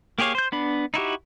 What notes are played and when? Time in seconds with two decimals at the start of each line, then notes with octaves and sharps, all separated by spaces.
0.19 A#3 G4 G#4 C#5 F5
0.35 C5 G6
0.52 B3 D4 B5
0.94 D#4 E4 F#4 G4